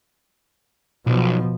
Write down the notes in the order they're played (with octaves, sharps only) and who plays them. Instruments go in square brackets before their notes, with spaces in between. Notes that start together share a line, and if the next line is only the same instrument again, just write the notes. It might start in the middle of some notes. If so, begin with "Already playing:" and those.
[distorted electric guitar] B1 [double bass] B2 F3